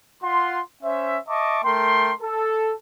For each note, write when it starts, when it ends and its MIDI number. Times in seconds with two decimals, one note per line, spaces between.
0.23 0.60 65
0.23 0.60 78
0.23 0.60 84
0.83 1.19 61
0.83 1.19 72
0.83 1.19 76
1.29 1.60 75
1.29 1.60 76
1.29 1.60 81
1.29 1.60 85
1.29 1.60 86
1.64 2.13 57
1.64 2.13 70
1.64 2.13 79
1.64 2.13 84
2.22 2.73 69